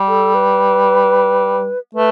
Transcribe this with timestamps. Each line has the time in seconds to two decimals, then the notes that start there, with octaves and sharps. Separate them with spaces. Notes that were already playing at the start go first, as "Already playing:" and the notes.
Already playing: G3
0.08 A4
0.35 B4
1.95 A3 B4